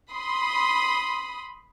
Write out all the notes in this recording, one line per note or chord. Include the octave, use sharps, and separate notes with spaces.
B5 C6 D#6